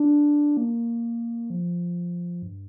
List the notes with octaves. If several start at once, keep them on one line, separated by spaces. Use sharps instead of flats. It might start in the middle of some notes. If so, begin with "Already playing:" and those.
Already playing: D4
A#3
F3
G2